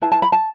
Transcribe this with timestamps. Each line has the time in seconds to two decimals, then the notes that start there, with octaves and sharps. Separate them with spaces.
0.02 E4 B4 A5
0.12 A5
0.22 B5
0.32 A5